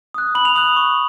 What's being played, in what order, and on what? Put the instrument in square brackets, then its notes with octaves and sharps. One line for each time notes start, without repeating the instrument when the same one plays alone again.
[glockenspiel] D#6 F#6
B5 F#7
F7
D#6 F#6 F#7
C#6